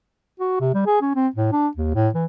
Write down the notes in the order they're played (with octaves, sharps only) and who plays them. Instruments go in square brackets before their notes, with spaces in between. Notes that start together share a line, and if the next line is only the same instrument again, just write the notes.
[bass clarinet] F#4
C3
G3
G#4
C#4
C4
A2
D4
D#2
A2
E3